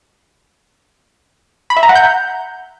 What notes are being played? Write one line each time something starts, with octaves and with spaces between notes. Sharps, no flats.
B5
E5
A#5
F#5
G6